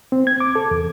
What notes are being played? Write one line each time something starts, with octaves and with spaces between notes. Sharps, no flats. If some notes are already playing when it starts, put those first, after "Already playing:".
C4
G#6
D6
A4
E2